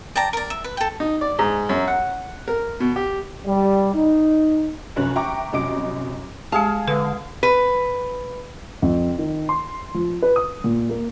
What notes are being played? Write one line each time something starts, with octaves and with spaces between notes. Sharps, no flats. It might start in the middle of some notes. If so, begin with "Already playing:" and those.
D5 G5 A5 A#5
A#4 D5
E5
B4
A4 G5
D#4
D5
G#2
F#2
F#5
A#4
B2
G4
G3
D#4
F1 F#2 C#4 F#6
E5 G5 A#5 C#6 D6
C2 F#2 D#5 D6 D7
G#3 G4 G#4 F5 A5
D3 G#3 B4
B4
F2
D#3
C6
F3
B4
D#6
A#2
A#3